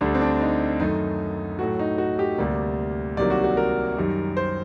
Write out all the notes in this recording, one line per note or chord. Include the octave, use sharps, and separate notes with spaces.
D2 D3 G3 D4
C4
D4
D#4
F#2 D#3 A3 D#4
A2 F#3 A3 F#4
D#4
F#4
G4
D2 C3 G3 A#3 D5
C2 C3 D#3 F#3 A#3 D5
F#4
F#4
A#4
F#2 D#3 G3
C5